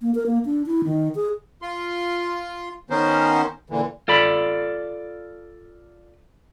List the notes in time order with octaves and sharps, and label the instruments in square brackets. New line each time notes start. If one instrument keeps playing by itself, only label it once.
[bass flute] A#3
A#4
A#3
D4
E4
D#3
G#4
[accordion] F4 C6
D#3 B3 C#4 A#4 C5
A#2 D3 E3
[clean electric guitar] F4 A4 D5 B5